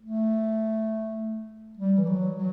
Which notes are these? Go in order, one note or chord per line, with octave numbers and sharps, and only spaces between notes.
A3
G3
E3
F#3
F#3